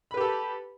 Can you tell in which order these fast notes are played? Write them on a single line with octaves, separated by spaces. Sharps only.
B5 B4 G4 A4